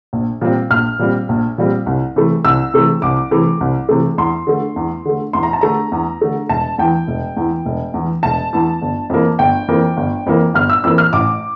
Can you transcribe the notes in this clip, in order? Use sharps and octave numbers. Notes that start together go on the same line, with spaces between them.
A#1
A#2 G3 C4
A#1 F6
A#2 G3 C4
A#1
A#2 G3 C4
C2
C3 E3 A3
C2 E6
C3 E3 A3
C2 D6
C3 E3 A3
C2
C3 E3 A3
E2 C6
D3 A3
E2
D3 A3
E2 C6
A#5
A5
D3 A3 A#5
E2
D3 A3
E1 A5
E2 E3 G5
E1
E2 E3
E1
E2
E3
E1 A5
E2 E3
G1
F2 E3 A#3
G1 G5
F2 E3 A#3
G1
F2 E3 A#3
G1 F6
E6
F2 E3 A#3 E6
F6
A1 D6